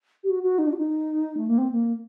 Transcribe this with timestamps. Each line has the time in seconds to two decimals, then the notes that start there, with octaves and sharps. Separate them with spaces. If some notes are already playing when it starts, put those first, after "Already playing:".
0.23 G4
0.29 F#4
0.43 F#4
0.58 D#4
0.67 D4
0.73 F#4
0.77 D#4
1.37 A3
1.47 A#3
1.58 C4
1.72 A#3